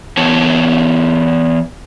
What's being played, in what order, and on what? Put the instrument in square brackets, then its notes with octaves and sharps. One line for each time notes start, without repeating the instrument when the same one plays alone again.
[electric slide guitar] E3 B3 C#5 A5